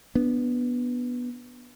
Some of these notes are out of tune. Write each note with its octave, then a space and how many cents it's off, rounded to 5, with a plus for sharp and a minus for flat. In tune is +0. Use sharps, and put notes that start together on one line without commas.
B3 -10 D4 +0